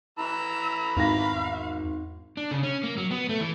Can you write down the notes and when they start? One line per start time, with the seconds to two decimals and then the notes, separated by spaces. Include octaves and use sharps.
0.19 E3 A#5 B5 E6
0.97 G#1 E2 F5 A#6
2.37 D4
2.51 C#3
2.63 C#4
2.83 A#3
2.97 F#3
3.11 B3
3.29 A3
3.41 E3